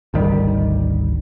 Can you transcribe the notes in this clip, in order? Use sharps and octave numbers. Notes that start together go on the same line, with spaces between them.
G#1 D2 D#3 G3